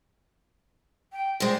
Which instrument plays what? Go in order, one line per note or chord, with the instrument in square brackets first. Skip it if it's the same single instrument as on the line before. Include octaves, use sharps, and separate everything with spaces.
[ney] G5
[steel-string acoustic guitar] G3 G#3 [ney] C5